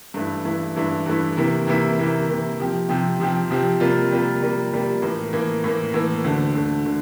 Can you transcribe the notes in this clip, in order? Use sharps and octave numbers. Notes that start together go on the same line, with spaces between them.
G2 E3 A3 E4
G2 E3 A3 E4
G2 E3 A3 E4
G2 E3 A3 E4
C3 E3 A#3 E4
C3 E3 A#3 E4
C3 E3 A#3 E4
C3 E3 A#3 E4
C3 F3 C4 G4
C3 F3 C4 G4
C3 F3 C4 G4
C3 F3 C4 G4
C3 G3 A#3 F4
C3 G3 A#3 F4
C3 G3 A#3 F4
C3 G3 A#3 F4
A2 E3 A#3
A2 E3 A#3
A2 E3 A#3
A2 E3 A#3
D2 D3 A3
D2 D3 A3
D3 A3